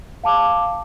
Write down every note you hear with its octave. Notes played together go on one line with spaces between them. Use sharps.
F5 A5 D6